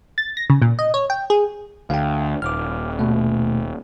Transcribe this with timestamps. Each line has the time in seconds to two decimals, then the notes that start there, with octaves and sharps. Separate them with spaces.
0.18 A6
0.37 A#6
0.50 C#3
0.62 A#2
0.79 D#5
0.94 C#5
1.10 G5
1.30 G#4
1.90 D2 F5 G5
2.42 D#1 D6 F6
2.99 B2 A3